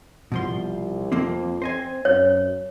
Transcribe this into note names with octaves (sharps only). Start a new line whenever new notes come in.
C2 B2 F3 C6
F2 F3 A#3 C4
C4 C5 D#5 G#5
F#2 C#5